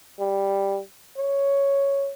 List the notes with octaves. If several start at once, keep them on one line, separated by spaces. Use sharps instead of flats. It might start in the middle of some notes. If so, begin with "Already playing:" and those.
G3
C#5